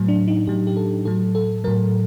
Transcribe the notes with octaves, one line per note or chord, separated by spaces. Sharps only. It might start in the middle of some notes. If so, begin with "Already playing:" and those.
Already playing: A2 F#3
D4
D#4
A2 F#3 G4
G4
A4
A2 F#3 A4
A4
A2 F#3 A#4